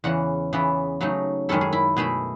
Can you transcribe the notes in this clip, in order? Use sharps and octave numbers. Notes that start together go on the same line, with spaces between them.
E2 C#3 E3 F#5
C#3 E3 B3 E4
C#3 F#3 A3 D#4
F#2 D#3 G#3 C#4 E4 A4
G#4
E4
B2 A3 E4 G#4